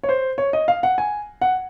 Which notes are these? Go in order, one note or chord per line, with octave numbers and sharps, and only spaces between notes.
C#5
C5
C#5
D#5
F5
F#5
G#5
F#5